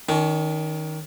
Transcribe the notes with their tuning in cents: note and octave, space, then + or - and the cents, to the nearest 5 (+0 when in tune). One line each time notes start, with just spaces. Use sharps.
D#3 +5 C#4 +40